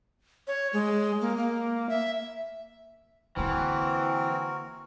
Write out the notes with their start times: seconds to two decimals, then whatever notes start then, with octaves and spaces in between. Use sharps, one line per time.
0.47 C#5
0.73 G#3
1.21 A#3
1.37 A#3
1.89 E5
3.36 D3 E3 A#3 C4 F#4 A#4